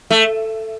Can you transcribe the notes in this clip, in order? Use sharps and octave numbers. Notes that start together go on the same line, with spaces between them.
A3